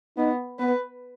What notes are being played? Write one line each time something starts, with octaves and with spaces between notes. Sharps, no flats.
B3 D#4
B3 B4